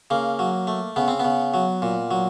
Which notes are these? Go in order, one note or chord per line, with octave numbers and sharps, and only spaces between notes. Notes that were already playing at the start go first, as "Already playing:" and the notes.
C#3 A#3
F#3
A3
C#3 B3
C4
B3
C#3
F#3
A#2
F#3